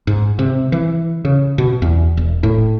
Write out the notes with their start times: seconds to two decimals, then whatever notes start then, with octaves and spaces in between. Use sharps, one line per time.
0.07 G#2
0.39 C3
0.72 E3
1.25 C#3
1.58 B2
1.82 E2
2.17 E1
2.43 A2